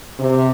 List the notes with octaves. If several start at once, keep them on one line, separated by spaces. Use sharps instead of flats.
C3